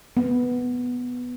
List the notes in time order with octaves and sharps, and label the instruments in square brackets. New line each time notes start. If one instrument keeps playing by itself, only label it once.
[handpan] B3